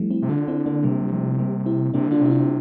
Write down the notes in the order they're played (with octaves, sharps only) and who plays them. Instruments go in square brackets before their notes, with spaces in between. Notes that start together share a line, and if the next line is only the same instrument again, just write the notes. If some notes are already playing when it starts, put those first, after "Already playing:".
Already playing: [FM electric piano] F3 G3 A3 C4 E4
C4 E4
[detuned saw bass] C3
[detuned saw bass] D3 [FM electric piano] D4 F4
[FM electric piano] C4 E4
A#3 D4
[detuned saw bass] C3 [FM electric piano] G3 A#3
[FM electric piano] G3
F3 A3
G3 A#3
C4 E4
[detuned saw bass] C3 [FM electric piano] A#3 D4
[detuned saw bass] D3 [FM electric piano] D4 F4
[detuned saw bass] C3 [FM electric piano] E4
[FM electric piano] D4 F4